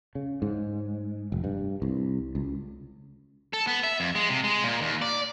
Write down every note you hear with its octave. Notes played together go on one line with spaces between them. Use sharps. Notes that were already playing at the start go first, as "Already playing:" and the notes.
C#3
G#2
F1
G2
C2
C#2
A4
B3
E5
F2
G#3
C3
G#3
A#2
D#2
D5